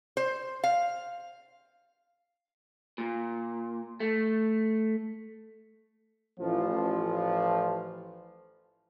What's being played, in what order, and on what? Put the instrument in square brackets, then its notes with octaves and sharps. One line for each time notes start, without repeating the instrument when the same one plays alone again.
[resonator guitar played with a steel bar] C5
F5
[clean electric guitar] A#2
A3
[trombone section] A1 F3